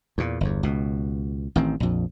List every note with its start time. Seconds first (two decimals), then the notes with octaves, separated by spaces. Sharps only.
0.18 E2 A#2
0.41 G1 E2
0.63 C#2 B2
1.56 A1 D#3 C4
1.80 A#1 F2